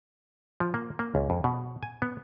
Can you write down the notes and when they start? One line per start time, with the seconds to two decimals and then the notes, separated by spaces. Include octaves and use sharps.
0.60 F3
0.74 A#3
0.99 A#3
1.15 C#2
1.30 F2
1.44 B2
1.83 G#5
2.02 B3